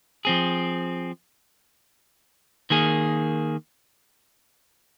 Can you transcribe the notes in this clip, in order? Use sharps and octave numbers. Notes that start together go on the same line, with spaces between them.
F3 C4 G#4
D#3 A#3 G#4